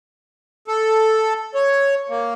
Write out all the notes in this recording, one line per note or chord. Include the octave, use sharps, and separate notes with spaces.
A4
C#5
A#3